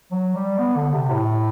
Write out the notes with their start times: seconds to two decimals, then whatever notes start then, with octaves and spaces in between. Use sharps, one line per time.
0.12 F#3
0.35 G3
0.58 B3
0.76 D3
0.93 C3
1.11 A2